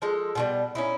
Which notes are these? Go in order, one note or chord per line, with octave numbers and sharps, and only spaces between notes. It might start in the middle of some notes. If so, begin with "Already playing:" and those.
F3 G#3 A4
B2 D#3 G3
C#4 D#4 E4